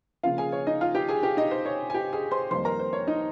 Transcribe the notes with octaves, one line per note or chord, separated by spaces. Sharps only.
C#3 F3 A#3 F4 F5
G#4 G#5
C#5
D#4 D#5
F4 F5
G4 G5
G#4 G#5
G4 G5
D#4 D#5
C5
C#5
G#5
G4 G5
G#4 G#5
C5 C6
F2 D#3 G3 A#3 C5 C6
A#4 A#5
C5
C#5
D#4 D#5